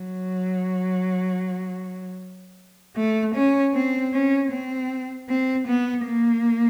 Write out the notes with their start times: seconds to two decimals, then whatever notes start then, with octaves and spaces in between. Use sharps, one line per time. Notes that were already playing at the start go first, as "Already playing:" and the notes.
Already playing: F#3
2.96 A3
3.35 C#4
3.74 C4
4.13 C#4
4.52 C4
5.29 C4
5.67 B3
6.05 A#3